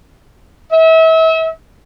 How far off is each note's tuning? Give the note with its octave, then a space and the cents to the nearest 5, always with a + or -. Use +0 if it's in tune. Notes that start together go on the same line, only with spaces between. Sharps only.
E5 -35